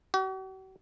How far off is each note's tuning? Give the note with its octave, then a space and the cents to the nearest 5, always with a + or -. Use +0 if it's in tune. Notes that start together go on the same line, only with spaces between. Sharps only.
F#4 +45